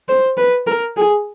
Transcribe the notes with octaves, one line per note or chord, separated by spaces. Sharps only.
C5
B4
A#4
G#4